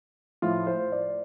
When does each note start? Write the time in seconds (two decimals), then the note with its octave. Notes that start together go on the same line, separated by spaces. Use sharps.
0.42 A2 F3 F4
0.67 C5
0.92 D5